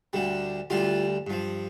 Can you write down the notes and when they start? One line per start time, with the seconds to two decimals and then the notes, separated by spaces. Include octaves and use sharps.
0.13 D2 D3 G3
0.70 D2 D3 G3 F4
1.27 G2 F3